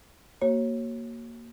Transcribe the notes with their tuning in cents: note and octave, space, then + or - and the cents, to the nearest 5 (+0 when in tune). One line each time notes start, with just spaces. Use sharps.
A#3 +0 F#4 +30 C#5 -20